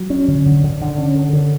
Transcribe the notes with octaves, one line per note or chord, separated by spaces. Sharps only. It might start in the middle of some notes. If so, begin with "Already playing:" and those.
Already playing: F#3
C#4
D3
D3
D3
D3
C#4
D3
D3